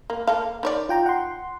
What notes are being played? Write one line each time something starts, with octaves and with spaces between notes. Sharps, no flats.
A#3
A#3 A4 F5
D#3 C#5 D5
F4 G5 A#5
F#5 C6